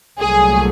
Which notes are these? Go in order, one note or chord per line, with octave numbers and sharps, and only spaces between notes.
C2 A#2 F#3 A3 G#4